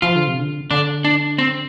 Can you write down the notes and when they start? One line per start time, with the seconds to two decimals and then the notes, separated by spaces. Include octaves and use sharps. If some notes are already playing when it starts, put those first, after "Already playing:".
0.02 F3 F4
0.16 D3
0.27 C3
0.39 D3
0.71 D3 D4
1.05 D4
1.38 C4